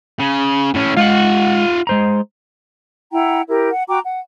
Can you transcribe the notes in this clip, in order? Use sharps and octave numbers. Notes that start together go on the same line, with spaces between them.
C#3
A2 C#4
G#3 F4 F5 F#5
G#3 C5 A#5
E4 F#5 G5 A#5
E4 G4 A#4
F#5
F#4 G5 A#5 D6
F#5